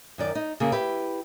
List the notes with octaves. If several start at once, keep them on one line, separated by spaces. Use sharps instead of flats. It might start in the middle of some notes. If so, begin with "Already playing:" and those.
F#2 D#3 D5
D#4
C#3 A#3 C4 G#4
E4 G4 B4